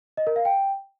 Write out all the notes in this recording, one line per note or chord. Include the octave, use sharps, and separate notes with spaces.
D#5
A#4
F5
G5